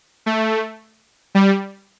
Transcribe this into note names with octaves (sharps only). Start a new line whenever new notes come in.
A3
G3